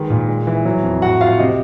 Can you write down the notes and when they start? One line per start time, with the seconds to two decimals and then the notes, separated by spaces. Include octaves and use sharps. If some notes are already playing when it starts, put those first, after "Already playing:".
Already playing: D#3 G#3 B4
0.10 A#2
0.28 G#3
0.47 E3
0.65 F#3
0.83 F2
1.02 A2 F#4 F#5
1.21 A2 F4 F5
1.39 C3 D#5